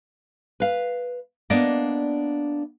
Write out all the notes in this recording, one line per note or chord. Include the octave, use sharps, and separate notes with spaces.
B4 F5
A#3 B3 D4 D5 D#5 F5